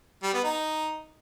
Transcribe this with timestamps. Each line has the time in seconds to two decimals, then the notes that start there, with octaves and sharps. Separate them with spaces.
0.23 G3
0.33 B3
0.44 D#4